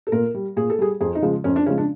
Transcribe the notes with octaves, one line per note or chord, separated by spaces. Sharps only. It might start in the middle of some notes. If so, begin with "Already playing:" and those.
A4
A#2 A#4
G3
A#2 G#4
A4
G3 G#4
F2 G#4
D#4
C#3 F3 G#3
F2 C#4
D4
C#3 F3 G#3 C#4
D4